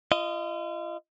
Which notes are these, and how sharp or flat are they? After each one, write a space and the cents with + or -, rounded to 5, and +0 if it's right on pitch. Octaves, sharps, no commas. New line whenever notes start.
F4 -40 D#5 +0